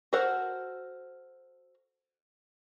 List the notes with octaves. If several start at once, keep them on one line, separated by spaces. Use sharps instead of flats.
F#4 A4 A#4 C5 F#5